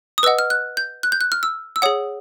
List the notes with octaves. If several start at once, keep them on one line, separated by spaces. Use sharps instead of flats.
D#6
B4 D#5 F#5 E6
F6
F#6
G6
F#6
G6
F#6
F6
E6
E6
G#4 C#5 F#5 D#6